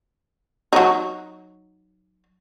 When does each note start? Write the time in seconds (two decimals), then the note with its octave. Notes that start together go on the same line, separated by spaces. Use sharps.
0.73 F#3 D#4